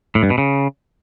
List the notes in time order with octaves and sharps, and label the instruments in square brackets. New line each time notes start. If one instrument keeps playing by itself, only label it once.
[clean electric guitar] A2
G2
B2
C#3